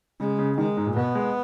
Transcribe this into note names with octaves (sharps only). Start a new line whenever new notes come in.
C#3 G#3
C#3
D#3 G#3
G#2
A#2
B2 B3
G#3